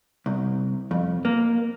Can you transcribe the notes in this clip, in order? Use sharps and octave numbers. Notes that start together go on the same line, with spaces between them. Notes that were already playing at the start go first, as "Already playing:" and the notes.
C2
F2
A#3